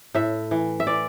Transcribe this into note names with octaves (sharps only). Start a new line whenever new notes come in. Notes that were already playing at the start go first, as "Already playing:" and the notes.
A2 E5
E3
E5
E3 D5